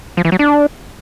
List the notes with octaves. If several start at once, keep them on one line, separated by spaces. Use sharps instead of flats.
F3
E3
F#3
D4